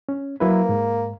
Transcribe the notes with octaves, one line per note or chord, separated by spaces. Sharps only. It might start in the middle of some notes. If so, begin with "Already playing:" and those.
C#4
F#3 A#3 E4 B4
G#2